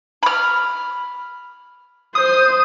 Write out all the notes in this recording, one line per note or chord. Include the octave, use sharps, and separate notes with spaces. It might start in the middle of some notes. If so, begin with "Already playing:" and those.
B5 F6
C5 D#6